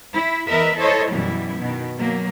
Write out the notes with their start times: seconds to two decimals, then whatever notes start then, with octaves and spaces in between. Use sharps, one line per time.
0.13 E4
0.48 E2 A#4 B4 D#5 E5
0.79 E4 A4 C5 C#5 D#5
1.11 F#2 B2 E3 G3 E4
1.58 B2 D#3 B3
1.98 B2 F#3 A#3